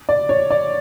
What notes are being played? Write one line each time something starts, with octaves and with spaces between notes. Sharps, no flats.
D5
C#5
D5